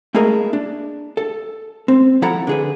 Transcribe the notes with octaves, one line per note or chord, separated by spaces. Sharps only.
A3 A#3 E4 G#4 A#4 D#5
D4
A4
C4
F3 E4 A4 F#5 A#5
D3 G#4 B4